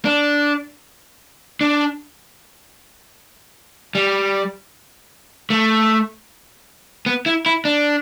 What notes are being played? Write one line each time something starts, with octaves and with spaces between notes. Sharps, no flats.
D4
D4
G3
A3
B3
E4
E4
D4